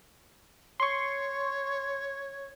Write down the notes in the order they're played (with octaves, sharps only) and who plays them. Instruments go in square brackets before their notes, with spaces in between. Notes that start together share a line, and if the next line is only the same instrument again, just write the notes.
[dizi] C#5 [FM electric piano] C6 C#6